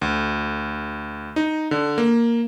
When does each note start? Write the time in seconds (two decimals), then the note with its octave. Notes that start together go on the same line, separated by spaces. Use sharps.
0.01 D2
1.36 D#4
1.71 D3
1.98 A#3